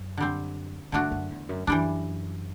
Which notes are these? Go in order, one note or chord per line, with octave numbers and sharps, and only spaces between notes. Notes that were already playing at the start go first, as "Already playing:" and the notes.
Already playing: F#2
D3 G3 C4
G2 D3 A3 D4 F#4
F#2
E2
F#2
F#2 E3 G3 D4